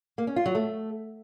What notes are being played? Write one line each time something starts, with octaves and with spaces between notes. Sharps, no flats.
A#3
C#4
F4
F#3
A3